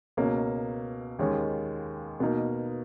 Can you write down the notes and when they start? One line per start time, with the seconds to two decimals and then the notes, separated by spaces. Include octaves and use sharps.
0.17 C#2 B2 A#3 C#4
1.19 D#2 D#3 G#3 C#4
2.20 B2 A#3 D#4